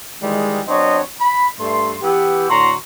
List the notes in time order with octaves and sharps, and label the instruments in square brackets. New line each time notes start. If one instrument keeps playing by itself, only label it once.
[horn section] D#3 E3 G3 G#3
F#3 B3 C4 D4 C#5 D#5
B5
G2 A3 C6
E3 B3 E4 G4
A2 D3 F#4 A#5 C6